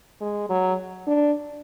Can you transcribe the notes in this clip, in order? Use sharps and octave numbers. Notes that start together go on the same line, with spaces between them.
G#3
F#3
D4